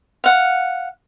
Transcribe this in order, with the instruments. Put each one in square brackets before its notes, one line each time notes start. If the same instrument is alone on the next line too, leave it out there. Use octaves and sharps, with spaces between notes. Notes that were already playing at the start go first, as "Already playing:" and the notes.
[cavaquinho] F5 F#5